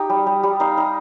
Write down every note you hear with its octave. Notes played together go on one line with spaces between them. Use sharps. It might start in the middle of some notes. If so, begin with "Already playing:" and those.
Already playing: D#4 G4
G3
G3
G3
D#4 F5
D#4